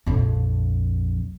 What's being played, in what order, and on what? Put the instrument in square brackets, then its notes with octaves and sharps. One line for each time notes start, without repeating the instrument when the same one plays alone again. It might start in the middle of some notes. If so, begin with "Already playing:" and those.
[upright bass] A#1 F2